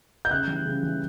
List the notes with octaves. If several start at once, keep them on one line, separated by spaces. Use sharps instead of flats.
G6
C#3 F#6
E3 G3
C#3
E3 G3